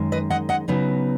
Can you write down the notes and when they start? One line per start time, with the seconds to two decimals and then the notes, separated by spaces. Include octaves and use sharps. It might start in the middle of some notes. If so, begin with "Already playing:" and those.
Already playing: F#2 D#3 G#3
0.12 B4 D#5
0.30 D#5 F#5
0.49 D#5 F#5
0.68 C#3 F#3 B3 D#4